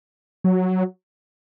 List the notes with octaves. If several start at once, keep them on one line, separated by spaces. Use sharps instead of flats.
F#3